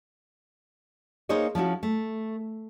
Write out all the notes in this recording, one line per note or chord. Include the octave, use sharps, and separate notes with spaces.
A#3 D#4 G#4 C5 C#5 D#5
F3 C#4 E4 F#4
A3